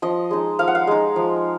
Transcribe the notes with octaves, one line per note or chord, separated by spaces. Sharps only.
F3 D#5
G#3 D#4
F3 F5
F#5
F5
G#3 D#4
F3